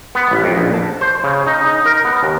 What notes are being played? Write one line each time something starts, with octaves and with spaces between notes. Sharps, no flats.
B3
A1
F2
A#1
A5
C5
C#3
D#4
D#4
A#4
B3
D#2